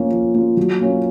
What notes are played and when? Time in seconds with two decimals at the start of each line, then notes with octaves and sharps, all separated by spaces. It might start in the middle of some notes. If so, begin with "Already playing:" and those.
Already playing: F3 A#3 C#4 F4
0.12 F3
0.34 A#3 C#4 F4
0.57 F#3
0.81 A#3 C#4 F4